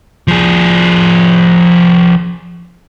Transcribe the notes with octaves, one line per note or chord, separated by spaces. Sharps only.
F3 G#4